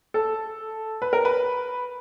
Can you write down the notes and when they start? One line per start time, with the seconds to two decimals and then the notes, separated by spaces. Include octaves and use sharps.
0.14 A4
1.02 B4
1.13 A#4
1.25 B4